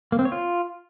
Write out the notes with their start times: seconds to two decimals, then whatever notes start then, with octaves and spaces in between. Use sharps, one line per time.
0.12 A#3
0.19 C4
0.25 C#5
0.32 F4